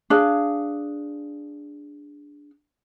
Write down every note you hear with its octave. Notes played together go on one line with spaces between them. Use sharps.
D4 G#4 F5